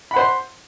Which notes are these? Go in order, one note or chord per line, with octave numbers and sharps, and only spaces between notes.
C5 F#5 B5